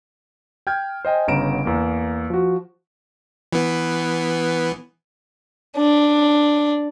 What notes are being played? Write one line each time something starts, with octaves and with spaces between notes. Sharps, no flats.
G5 F6 G6 G#6
C5 D#5 G5 G#5
G1 C#3 B3 A#5 D7 E7
E2 A#3
F3 F#4
E3 B3
D4